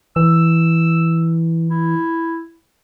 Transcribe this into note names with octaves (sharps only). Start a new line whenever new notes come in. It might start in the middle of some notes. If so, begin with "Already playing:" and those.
E3 E6
E4